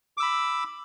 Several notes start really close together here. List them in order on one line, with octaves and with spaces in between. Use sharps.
D6 E6 B5